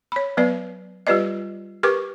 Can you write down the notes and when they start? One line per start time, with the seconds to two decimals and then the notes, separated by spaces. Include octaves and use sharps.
0.12 C#5 B5
0.37 F#3 B3 B4 D5
1.07 G3 F4 G4 B4 D5 D#5
1.83 G4 A#4 B4 C#6 D6